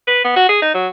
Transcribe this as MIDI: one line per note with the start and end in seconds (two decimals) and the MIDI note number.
0.07 0.23 71
0.24 0.34 59
0.36 0.49 66
0.49 0.62 68
0.62 0.72 63
0.74 0.87 54